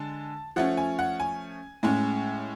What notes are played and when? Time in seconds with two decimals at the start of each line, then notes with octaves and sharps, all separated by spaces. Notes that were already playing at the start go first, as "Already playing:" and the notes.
Already playing: D3 G#3 A5
0.56 F3 A3 C#4 F#5
0.77 G#5
0.99 F#5
1.20 G#5
1.83 A2 G#3 C#4